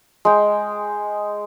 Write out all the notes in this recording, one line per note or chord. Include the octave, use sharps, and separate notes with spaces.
G#3 G5